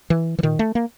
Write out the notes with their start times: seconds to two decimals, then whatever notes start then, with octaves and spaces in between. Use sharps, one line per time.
0.10 E3
0.39 E3
0.43 A#2 D#3
0.59 A3
0.75 A#3